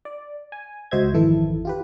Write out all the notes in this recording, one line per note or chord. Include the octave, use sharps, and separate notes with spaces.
D5
G#5
C#2 F#4 C5 D#5 E5 G#6
G#1 F2 D#3 E3 E4 A4
F4 G4 B4